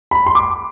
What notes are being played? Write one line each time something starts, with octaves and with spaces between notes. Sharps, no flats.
B5
C6
D6